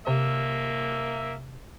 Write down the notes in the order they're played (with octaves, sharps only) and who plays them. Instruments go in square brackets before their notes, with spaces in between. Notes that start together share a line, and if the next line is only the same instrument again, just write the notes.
[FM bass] C3 [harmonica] A#3 E5